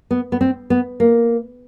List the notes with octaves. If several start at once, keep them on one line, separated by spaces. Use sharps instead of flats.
B3
B3
C4
B3
A#3